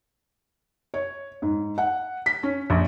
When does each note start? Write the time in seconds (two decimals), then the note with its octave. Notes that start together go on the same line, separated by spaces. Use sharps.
0.94 C#5
1.42 G#2
1.78 F#5
2.26 B6
2.43 C#4
2.70 A#1